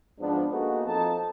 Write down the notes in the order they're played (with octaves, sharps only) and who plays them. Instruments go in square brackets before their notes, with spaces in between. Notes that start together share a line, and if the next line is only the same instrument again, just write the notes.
[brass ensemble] G#2 F3 B3 D4
A#3 B3 D#4 F#4 G#4 A4
F2 D#4 A5